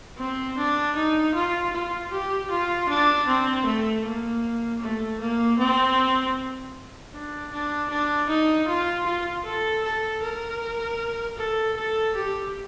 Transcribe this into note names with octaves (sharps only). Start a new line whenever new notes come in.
C4
D4
D#4
F4
F4
G4
F4
D4
C4
A3
A#3
A3
A#3
C4
D4
D4
D4
D#4
F4
F4
A4
A4
A#4
A4
A4
G4